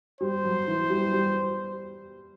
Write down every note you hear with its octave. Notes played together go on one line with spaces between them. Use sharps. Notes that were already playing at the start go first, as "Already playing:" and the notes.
G3 C5
F#3
E3
G3
G3